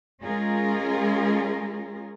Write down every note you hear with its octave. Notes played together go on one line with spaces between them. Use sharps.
G#3 C#4 F4 G#4 A#4